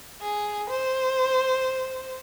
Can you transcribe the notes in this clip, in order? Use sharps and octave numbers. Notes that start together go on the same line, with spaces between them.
G#4
C5